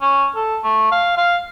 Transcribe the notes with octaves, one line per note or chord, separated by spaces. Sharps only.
C#4
A4
A3
F5
F5